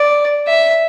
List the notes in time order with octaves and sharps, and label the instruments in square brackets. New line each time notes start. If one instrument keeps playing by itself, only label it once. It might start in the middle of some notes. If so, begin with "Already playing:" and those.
Already playing: [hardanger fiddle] D5
E5